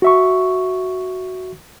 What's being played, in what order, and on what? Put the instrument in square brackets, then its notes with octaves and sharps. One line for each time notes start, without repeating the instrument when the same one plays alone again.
[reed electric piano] F#4 E5 C#6